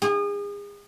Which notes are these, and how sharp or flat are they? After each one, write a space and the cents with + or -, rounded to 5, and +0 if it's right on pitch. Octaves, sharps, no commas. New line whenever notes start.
G#4 -35